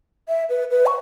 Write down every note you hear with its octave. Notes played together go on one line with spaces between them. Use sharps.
E5
B4
B4
C#6